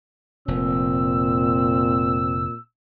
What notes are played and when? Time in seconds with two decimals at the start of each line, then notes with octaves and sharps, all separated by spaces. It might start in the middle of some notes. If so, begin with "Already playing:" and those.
0.48 F1 A#2 C4 E6